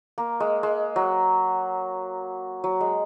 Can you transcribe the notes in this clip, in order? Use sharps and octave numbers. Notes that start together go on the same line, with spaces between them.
A#3
G#3
G#3
F#3
F#3
G#3